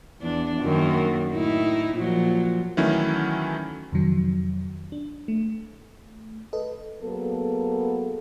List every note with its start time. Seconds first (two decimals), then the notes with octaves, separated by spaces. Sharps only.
0.21 E2 D4
0.61 F#2 D#3 A#3
1.32 A2 D#4 E4
1.95 A#2 F3 F#3
2.77 D#3 E3 F#3 A3 C#4 E4
3.92 F2 C3 D#3 F#3
4.92 D4
5.28 A3
6.53 A4 B4 D#5
7.03 F#3 A#3 B3 G#4 A4